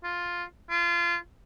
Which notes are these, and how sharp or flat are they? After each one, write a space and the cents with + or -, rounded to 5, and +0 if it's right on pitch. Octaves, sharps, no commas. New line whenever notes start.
F4 +5
F4 -25